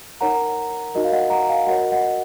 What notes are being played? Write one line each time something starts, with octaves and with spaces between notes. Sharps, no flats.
D#4 A#4 C#5 F#5 A#5
D#4 F#4 A#4 D#5
F5
D#5 F#5
F#5 A#5
F5 G#5
F#4 A#4 C#5 D#5 F#5
D#5 F#5